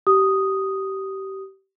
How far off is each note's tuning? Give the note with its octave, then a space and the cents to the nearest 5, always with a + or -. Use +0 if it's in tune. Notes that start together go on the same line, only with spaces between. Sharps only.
G4 -25 D#6 +0